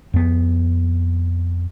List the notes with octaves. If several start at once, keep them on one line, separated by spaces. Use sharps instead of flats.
F2 B3